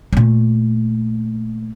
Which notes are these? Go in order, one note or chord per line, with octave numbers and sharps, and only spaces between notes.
A#2 A3